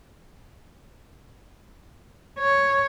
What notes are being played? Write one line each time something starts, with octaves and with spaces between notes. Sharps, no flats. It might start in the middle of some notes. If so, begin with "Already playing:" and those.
C#5